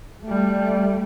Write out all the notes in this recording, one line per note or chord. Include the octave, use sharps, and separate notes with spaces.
G3 A3